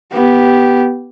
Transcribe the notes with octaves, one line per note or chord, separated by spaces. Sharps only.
B3 G4